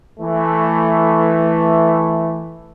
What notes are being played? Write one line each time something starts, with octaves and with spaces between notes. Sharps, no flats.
E3 A3